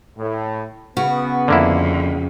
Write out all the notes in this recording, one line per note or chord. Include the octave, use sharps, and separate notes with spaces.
A2
C#3 B3 F#4
F2 D3 A#3 E4